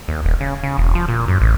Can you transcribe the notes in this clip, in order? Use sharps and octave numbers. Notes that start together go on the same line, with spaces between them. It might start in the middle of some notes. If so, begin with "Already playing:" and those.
D#2
D#1
C#3
C#3
E1
F3
A#2
F#2
A1